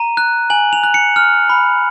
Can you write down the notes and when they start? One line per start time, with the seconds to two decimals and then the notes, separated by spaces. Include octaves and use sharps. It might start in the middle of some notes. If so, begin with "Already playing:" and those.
Already playing: A#5 D#7
0.17 F#6
0.50 G#5 F#7
0.73 F7
0.83 F#6
0.94 C#7
1.16 F6
1.49 B5